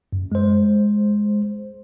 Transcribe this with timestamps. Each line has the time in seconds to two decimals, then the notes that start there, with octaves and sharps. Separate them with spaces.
0.13 F#2
0.32 G#3 C5